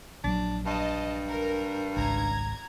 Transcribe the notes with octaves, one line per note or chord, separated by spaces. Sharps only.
A#1 F#3 D4
G2 D#5 A5
A#4
G#1 C#2 A#5 G#6